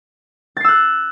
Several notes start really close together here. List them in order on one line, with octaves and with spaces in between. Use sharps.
A6 C7 E6 F#6